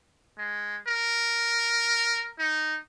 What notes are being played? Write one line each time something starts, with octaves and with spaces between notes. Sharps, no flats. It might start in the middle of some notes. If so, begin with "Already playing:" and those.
G#3
A#4
D#4